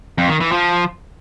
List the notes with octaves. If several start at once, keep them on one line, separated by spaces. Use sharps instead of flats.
F2
D#3
E3
F3